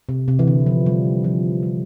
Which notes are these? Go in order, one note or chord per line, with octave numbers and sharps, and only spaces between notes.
C3
C3
E3
D3
F3
G3
F3
G3